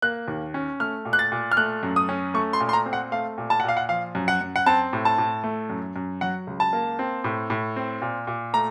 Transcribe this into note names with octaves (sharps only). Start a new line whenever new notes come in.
A#3 F#6
D#2
C#4
A3 F6
A#2
F#6
A6
A#2
F6
A3 F#6
F#2
D#6
C#4
A3 C#6
C6
A#2
C6
A#5
C4
F#5
A3 F5
A#2
A5
F#5
A#2 F5
F#5
F3 F5
F#2
F#5
F#2
F#5
C4 A5
A2
A5
A2
A3
F#2
F#2
F#3 F#5
C#2
A5
A#3
C4
A2
A2
C4
A#2
A#2
A3 A#5